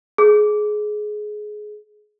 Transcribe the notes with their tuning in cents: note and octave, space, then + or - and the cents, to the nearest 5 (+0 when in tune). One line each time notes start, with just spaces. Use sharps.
G#4 +20